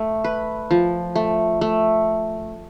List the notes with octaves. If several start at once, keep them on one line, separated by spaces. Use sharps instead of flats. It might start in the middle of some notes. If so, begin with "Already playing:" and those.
Already playing: A3
B4
F3
A3
A3